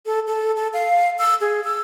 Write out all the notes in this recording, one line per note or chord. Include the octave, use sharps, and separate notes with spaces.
A4
A4
A4
F5
E6
G#4
E6